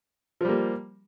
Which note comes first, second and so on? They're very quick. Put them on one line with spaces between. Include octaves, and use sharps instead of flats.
F3 G3 A#3